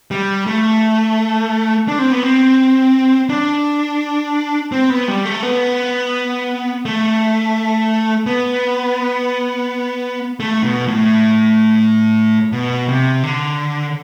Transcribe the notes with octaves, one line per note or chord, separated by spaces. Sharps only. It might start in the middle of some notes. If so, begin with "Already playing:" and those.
G3
A3
D4
C4
B3
C4
D4
C4
B3
G3
A3
B3
A3
B3
A3
B2
A2
B2
C3
D3